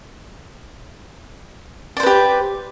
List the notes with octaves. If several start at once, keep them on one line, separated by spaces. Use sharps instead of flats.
G4 B4 C5 D5